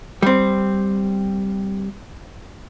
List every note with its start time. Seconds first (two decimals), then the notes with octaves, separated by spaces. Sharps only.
0.22 G3 C4